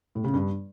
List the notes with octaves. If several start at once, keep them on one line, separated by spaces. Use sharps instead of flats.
A2
C#3
G2